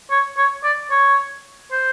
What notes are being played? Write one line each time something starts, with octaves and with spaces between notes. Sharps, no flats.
C#5
C#5
D5
C#5
C5